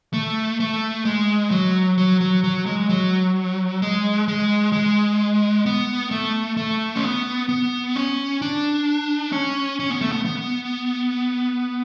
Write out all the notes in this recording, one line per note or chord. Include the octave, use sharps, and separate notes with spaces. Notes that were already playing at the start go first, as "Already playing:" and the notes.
A3
A3
G#3
F#3
F#3
F#3
F#3
G#3
F#3
G#3
G#3
G#3
B3
A3
A3
C#4
B3
B3
C#4
D4
C#4
C#4
B3
A3
B3
B3